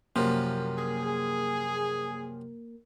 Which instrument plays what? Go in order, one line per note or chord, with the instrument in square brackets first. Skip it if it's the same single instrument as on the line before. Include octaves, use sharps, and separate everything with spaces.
[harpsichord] F#2 C3 F3 [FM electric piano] A#3 A#4
[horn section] G#4